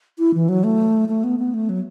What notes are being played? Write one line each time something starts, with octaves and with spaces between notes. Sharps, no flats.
E4
E3
F#3
A3
A3
B3
B3
A3
F#3